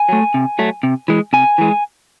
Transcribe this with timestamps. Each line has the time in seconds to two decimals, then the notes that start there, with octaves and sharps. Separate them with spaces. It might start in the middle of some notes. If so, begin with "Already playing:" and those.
Already playing: G#5
0.09 F#3 A3
0.34 C3
0.59 F#3 A3
0.83 C3
1.08 E3 G#3
1.33 C3 G#5
1.58 E3 G#3